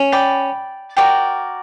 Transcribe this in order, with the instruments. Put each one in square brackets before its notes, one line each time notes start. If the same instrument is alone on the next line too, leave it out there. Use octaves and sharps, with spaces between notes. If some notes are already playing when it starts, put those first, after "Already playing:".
Already playing: [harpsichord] C#4
[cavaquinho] D5 G5 B5
F#4 A#4 D5 G5